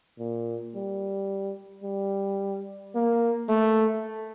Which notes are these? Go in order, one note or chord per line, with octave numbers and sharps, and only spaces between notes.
A#2
G3
G3
A#3
A3